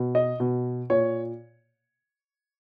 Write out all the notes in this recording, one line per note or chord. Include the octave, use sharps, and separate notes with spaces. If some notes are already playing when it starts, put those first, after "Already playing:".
Already playing: B2
D#5
B2
A#2 C#5